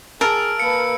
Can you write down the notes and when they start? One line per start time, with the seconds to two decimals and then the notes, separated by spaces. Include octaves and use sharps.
0.21 G#4 A#4 A5 E6 F6 D7
0.60 A#3 B4 C#7